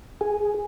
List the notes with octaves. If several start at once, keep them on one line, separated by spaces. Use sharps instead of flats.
G#4